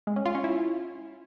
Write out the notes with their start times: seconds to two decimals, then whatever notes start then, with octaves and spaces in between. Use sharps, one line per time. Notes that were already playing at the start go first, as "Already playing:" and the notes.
0.07 G#3
0.16 C#4
0.26 F4
0.35 C#4
0.44 E4